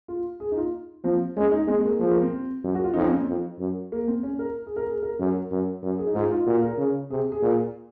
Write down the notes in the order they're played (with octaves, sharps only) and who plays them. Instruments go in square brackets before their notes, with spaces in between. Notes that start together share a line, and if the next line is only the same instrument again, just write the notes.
[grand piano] F4
G#4
D#4
F4
[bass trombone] F3 [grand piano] C4
[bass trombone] G#3 [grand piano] C#4
[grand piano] D#4
[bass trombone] G#3 [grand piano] C4
[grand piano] G#3
A#3
[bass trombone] F3 [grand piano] G#3
[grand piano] A#3
C4
[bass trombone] F#2
[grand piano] F#4
F4
[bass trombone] F2 [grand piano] D#4
[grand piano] C#4
C4
[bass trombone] F2
F#2
[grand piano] A#3
C4
C#4
A#4
G#4
A#4
G#4
A#4
[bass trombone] F#2 [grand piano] A#4
[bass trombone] F#2
F#2
[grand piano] G#4
D#4
[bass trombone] G#2 [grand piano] F4
[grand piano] D#4
F4
[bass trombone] A#2 [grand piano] F#4
[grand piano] A#4
[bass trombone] C#3
[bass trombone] C3 [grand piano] G#4
[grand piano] G#4
[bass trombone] A#2